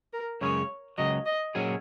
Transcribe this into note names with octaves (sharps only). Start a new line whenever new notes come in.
A#4
F#2 C#3 G#3 C#4 C#5
C#2 C#3 F#3 D#5
D#5
A#2 F#3 C#4 G#4